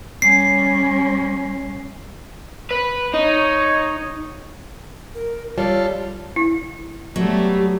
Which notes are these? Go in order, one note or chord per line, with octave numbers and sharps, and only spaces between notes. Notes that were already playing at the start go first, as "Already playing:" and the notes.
G3 C#4 C7
B4
D#4 C#5
A#4
G3 F4 A4 C#5 D5
E4
F#3 G3 A3 B3 G4